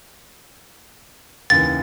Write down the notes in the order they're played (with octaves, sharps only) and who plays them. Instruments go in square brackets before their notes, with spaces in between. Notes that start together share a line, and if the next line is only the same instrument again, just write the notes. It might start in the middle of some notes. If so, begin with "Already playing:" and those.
[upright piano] D#2 C#3 E3 [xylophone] A6